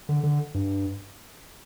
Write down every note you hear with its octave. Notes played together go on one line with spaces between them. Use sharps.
D3
D3
G2